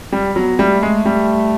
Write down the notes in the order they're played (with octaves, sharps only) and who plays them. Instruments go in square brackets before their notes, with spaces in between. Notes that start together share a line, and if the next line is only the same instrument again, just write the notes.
[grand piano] G3
[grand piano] F#3 [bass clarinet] B3
[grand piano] G3 [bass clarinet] A3
[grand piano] G#3
G3